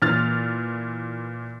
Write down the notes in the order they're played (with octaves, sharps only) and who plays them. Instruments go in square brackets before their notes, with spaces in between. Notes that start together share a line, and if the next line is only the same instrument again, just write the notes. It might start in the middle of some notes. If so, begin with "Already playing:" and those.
[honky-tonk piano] A#2 E3 F6 A6